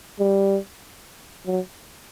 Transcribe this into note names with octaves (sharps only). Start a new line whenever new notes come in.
G3
F#3